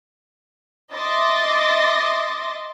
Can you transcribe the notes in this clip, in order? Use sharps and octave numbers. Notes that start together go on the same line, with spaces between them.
D#5 E5 C6 D6 A6 A#6